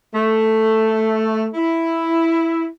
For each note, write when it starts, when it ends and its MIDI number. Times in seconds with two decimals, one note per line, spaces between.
0.14 1.47 57
1.54 2.65 64